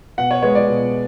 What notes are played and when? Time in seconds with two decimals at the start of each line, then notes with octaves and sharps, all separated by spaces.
0.18 B2 F#5
0.31 C#5
0.43 G#3 B3 C#5
0.55 D5
0.68 B2